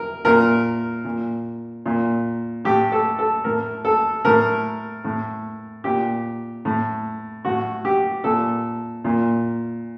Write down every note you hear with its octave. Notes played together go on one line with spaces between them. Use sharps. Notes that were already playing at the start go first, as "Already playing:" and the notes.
Already playing: A#4
A#2 A#4
A#2
A#2
A2 G4
A4
A4
A2 A#4
A4
A2 A#4
A2
A#2 G4
A2
A2 F#4
G4
A#2 A4
A#2